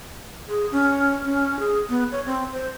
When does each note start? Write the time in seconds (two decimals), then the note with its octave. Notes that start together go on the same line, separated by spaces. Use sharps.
0.49 G#4
0.72 C#4
1.25 C#4
1.59 G#4
1.89 B3
2.12 C#5
2.26 C4
2.53 C5